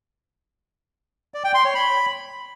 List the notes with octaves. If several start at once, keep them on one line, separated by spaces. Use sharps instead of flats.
D5
G5
C6
C#5
B5